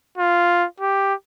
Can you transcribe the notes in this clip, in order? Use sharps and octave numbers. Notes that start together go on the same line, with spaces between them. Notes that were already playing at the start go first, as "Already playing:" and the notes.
F4
G4